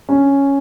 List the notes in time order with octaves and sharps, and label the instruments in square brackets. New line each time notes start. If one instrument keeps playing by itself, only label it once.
[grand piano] D3 C#4